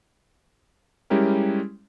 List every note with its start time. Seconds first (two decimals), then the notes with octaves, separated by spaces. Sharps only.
1.10 G3 G#3 C#4 E4 G4 A#4